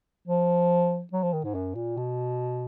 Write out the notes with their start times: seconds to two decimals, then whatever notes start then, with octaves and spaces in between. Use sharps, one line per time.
0.28 F3
1.13 F#3
1.23 F3
1.33 D#3
1.44 G#2
1.55 F#2
1.75 A#2
1.97 B2